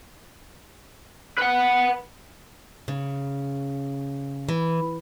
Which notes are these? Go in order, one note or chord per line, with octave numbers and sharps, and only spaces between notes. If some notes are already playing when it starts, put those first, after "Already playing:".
B4 F#5
C#3
E3